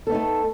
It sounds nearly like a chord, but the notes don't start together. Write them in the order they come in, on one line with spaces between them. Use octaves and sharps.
A4 B3 D#4 A3